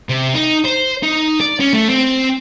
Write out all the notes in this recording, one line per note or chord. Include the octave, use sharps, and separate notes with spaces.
C3
D#4
C5
D#4
D5
C#4
A3
C4